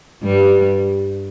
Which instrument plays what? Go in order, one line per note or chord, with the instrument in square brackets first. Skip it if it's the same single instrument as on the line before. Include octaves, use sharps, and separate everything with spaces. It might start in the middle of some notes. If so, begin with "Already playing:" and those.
[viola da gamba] G2 G3